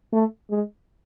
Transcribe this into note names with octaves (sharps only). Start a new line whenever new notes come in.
A3
G#3